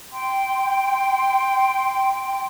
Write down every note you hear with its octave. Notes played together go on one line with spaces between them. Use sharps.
G5 C6